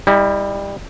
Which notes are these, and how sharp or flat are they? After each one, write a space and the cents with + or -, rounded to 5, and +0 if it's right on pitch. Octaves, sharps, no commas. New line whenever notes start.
G3 +25 E4 -40